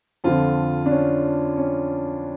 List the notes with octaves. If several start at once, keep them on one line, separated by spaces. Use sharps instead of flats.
F2 D3 F3 F4
D4
C#4
C#4